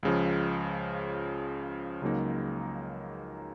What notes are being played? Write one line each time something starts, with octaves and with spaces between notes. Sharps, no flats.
C#2 C#3 F3
C#2 C#3 F#3 A#3 D#4